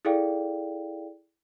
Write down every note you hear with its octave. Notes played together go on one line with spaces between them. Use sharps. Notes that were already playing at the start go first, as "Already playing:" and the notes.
E4 G#4 A4 D5 F5 G5